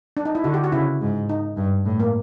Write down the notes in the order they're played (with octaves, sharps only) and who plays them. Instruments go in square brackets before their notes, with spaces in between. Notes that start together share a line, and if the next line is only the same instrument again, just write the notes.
[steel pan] D4
D#4
E4
[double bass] D3 [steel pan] F#4
[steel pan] G4
F#4
[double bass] C#3 [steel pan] E4
[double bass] G#2
[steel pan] D#4
[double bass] G2
A2
[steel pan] A#3